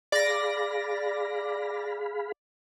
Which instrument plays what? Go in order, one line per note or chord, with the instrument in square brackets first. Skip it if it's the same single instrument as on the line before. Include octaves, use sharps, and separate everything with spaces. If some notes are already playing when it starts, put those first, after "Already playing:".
[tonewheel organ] G#4 F5 B5 [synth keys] D5 A#6